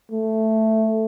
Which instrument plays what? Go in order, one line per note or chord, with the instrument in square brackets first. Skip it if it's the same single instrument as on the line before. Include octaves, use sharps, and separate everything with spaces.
[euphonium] A3